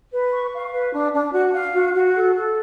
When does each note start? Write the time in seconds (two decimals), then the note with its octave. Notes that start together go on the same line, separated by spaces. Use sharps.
0.11 B4
0.32 C#6
0.52 F5
0.72 B4
0.92 D4
1.13 D4
1.33 F#4
1.53 F5
1.74 F#4
1.94 F#4
2.14 A4
2.35 A4